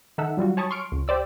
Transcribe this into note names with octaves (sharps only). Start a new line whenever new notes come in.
D#3 D#4 A4 E5 F#5 E6
F#3 G3 F4 F#4
C#5 G#5 A5 B5 C#6 D#6
C6 C#6 F6 D7
C#2
G4 C5 D5 E6